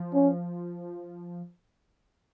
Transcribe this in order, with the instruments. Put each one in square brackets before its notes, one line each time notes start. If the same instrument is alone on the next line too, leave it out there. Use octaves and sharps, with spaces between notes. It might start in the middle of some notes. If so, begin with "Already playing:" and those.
Already playing: [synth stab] F3
[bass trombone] C#4